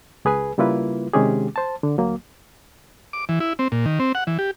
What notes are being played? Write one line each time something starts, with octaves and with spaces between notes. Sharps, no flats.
C#2 G#4 B4 G#5
C#3 G3 A#3 E4 F4 B4
C3 D#3 G#3 C#4 G4 G#4
C5 A5
D3
D2 F#3 A#3
D6
E3
E4
C4
A#2
D#3
C4
F#5
E3
G4